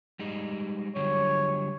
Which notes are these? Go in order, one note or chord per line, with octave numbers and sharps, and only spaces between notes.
G3 G#3 D#4
D3 F#3 G3 C#5